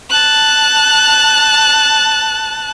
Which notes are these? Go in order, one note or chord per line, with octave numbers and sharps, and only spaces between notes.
A5 F#6